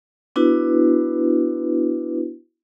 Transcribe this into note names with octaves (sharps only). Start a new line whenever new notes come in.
B3 D4 E4 F#4 B4